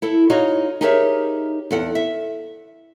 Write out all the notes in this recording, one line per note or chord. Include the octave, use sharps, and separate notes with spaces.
E4 A4
D#4 F4 F#4 C#5 D#5
D#4 G4 G#4 A#4 C#5 E5
E2 A4 F#5
E5